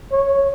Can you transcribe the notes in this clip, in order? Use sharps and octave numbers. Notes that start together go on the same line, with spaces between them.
C#5